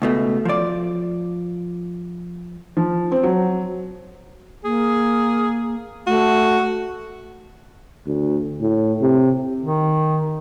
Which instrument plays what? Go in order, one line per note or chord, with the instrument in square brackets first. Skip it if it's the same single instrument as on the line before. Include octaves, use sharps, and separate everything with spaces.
[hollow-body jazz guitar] C#2 B2 A3
F3 D5
[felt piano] F3
C4
F#3
[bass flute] A#3 [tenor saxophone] G#4
[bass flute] A3 [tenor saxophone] F#4
[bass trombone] D2
A2
C3
[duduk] D#3